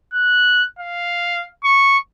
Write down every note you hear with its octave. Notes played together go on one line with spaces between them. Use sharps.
F#6
F5
C#6